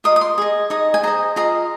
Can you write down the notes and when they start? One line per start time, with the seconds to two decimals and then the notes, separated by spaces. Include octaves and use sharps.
0.04 F4 A#4 D#5 D#6
0.16 D#6
0.21 C6
0.38 G#4 D#5
0.70 D#4 G#4 D#5
0.94 G#5
1.03 G#4 C5 D#5 A#5
1.36 F4 G#4 D#5 A#5